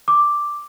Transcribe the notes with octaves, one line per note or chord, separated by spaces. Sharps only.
D6